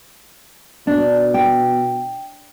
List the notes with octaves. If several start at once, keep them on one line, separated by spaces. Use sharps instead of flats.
B2 D4
G5